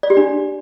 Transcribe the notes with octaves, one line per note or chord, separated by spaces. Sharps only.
D5
G4
D4